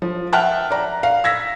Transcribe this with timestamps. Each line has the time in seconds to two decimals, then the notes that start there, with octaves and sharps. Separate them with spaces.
0.02 F3
0.33 E5 F#5 G5 A5 F6 F#6
0.71 D5 A#5
1.03 F5
1.24 E6 G#6 A#6 B6